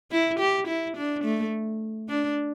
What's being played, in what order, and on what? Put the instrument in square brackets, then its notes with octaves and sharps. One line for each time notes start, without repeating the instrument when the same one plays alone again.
[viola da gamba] E4
G4
E4
D4
A3
D4